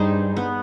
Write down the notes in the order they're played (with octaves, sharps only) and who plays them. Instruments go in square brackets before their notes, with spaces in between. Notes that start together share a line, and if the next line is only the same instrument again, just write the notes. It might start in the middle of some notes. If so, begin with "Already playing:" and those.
Already playing: [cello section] G2 G3 [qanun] D#4 G#4 C5
[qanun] B3